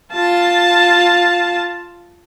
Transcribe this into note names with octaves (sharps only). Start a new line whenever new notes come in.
F4 A5